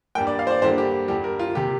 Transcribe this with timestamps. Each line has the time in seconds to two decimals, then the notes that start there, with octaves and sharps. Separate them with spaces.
0.15 G2 G3 A#3 G5
0.27 D5
0.39 F5
0.47 C5
0.50 D5
0.62 G2 D3 G3 A#3 C5
0.78 G4
1.08 G2 D3 G3 G4
1.24 A#4
1.39 F4
1.55 C3 A#3 G4